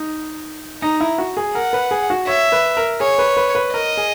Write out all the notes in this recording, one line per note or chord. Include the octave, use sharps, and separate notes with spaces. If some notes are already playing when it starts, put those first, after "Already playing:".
Already playing: D#4
D#4 A#5
E4
F#4
G#4
A#4 F#5
B4
G#4
F#4
C#5 E5
B4
A#4
G#4 C#5
B4
B4
B4
A#4 D#5
G#4